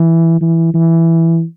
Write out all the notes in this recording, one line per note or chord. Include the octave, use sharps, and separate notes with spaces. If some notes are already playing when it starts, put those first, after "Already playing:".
Already playing: E3
E3
E3